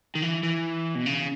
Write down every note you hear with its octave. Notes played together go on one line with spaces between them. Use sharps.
D#3
E3
E3
B2
C#3